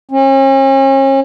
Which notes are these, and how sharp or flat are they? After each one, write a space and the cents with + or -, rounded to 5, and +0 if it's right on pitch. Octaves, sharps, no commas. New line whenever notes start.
C#4 -40